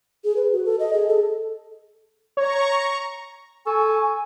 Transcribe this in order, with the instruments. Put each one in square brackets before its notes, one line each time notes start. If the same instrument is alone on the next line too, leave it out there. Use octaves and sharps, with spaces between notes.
[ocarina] G#4
B4
F#4
A4
D#5
G#4
A4
[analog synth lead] C#5 [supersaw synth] A#5 C#6
[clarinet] A4 [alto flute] G#5 [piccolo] C#6